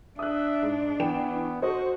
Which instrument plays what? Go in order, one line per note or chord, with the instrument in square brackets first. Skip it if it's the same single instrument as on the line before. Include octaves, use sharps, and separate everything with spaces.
[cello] D4 [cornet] E5 [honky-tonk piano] D#6 F#6
[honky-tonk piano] G#2
[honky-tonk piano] E3 G5 E7 [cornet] B3
[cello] F#4 [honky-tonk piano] A4 C5 [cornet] D#5